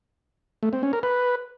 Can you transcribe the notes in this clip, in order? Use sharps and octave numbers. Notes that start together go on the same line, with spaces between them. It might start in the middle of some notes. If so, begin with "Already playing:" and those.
A3
C4
C#4
A#4
B4